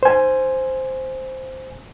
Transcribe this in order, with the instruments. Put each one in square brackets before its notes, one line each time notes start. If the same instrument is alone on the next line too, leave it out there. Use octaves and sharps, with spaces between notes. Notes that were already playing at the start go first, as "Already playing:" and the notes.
[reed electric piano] C5 G#5